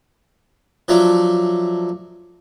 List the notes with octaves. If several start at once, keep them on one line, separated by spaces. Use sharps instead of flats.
F3 F#3 A3 D4